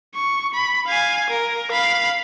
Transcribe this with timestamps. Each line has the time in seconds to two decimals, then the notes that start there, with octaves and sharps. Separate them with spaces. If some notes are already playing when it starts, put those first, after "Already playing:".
0.15 C#6
0.54 B5
0.87 F5 G#5
1.30 A#4
1.72 F5 B5